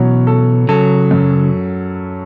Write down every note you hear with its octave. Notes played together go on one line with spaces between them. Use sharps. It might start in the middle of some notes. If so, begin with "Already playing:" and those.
Already playing: B2 E3 F#3 C#4
A4
C#3 F#3 A4
F#2